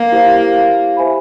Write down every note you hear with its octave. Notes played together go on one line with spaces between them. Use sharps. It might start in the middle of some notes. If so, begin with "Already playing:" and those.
Already playing: A#3
E4 G4 C5 F5
G4 C5 E5 G#5 B5